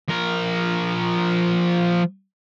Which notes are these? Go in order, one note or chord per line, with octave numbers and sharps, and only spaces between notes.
F3 A#4